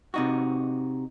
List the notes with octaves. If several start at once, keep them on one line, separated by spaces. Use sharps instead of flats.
C3 D#4 F#4